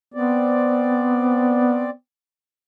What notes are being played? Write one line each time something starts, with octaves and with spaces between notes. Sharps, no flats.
B3 C4 D5